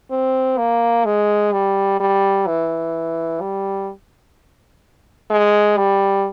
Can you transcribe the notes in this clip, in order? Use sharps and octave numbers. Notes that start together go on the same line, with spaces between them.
C4
A#3
G#3
G3
G3
E3
G3
G#3
G3